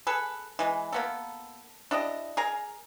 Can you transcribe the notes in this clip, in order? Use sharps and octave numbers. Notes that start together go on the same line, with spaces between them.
G#4 A4 B4
E3 G#3
A#3 B3 A4
D4 E4 G4 D#5
G#4 A#4 A#5